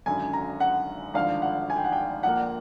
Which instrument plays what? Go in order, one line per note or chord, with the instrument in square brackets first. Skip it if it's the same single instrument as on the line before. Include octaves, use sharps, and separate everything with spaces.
[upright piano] G#1 F#2 D3 G#5
A#5
F#5
G#1 G2 D3 F3 F5
F#5
G#5
G5
F#5
G5
A#1 A#2 F3 A#3 F#5